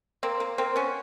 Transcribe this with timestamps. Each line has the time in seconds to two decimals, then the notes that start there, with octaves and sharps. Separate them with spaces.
0.23 A#3 C4
0.40 A#3
0.58 A#3 C4
0.76 B3 C#4